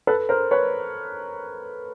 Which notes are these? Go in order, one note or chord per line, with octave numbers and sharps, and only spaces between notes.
A4 B4
A#4 C5
B4 C#5